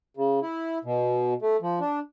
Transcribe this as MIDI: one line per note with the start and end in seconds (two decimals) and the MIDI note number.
0.17 0.40 49
0.43 0.78 64
0.84 1.34 47
1.42 1.57 57
1.61 1.79 53
1.80 1.99 62